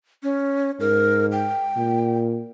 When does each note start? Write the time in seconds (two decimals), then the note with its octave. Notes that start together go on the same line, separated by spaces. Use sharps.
0.23 C#4
0.80 G#2 A#4
1.32 G5
1.77 A#2